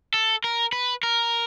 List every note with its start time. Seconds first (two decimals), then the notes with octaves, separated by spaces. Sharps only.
0.14 A4
0.44 A#4
0.73 B4
1.03 A#4